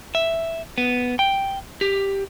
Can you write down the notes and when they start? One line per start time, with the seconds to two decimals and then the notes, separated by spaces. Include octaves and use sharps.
0.15 E5
0.78 B3
1.19 G5
1.81 G4